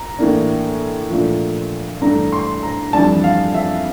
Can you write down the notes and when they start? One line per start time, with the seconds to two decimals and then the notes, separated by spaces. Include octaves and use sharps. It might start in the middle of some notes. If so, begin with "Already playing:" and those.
Already playing: A#5
0.19 A2 E3 A#3 D4
1.10 A#2 F3 A3 D4
2.01 G2 E3 A3 D4 A#5
2.33 C6
2.63 A#5
2.93 F2 E3 G3 D4 A5
3.24 F5
3.54 E5